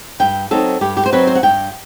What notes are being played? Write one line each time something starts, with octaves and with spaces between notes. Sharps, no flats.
G2 G5
F#3 C4 D#4 A4
G2 G4
G4
C5
F#3 C4 D#4 B4
C5
F#5
G2 G5